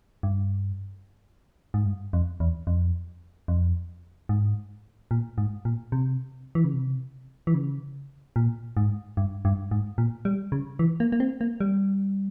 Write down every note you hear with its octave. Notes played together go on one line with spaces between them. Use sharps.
G2
G#2
G2
F2
E2
F2
F2
G#2
A#2
G#2
A#2
C3
E3
C#3
C3
E3
C#3
A#2
G#2
G2
G2
G#2
A#2
G3
C#3
E3
A#3
A#3
C4
A#3
G3